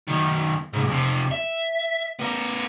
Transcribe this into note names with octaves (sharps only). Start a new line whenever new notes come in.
F#2 D#3
C2 G#2
F2 C3
E5
B3 A#4